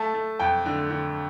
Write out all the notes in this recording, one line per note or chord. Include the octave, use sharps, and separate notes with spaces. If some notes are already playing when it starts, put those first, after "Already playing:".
Already playing: A3 A5
A3
F2 G5
D3
D3